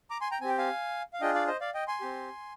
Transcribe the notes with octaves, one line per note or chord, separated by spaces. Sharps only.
A#5 D6
G#5 C6
G5 A#5
C4 G4 G5 G#5
F5 G#5
F5
D4 F4 G#4 D#5 G5
D5 F5
C5 D#5
D5 F5
D#5 G5
G#5 C6
C4 G4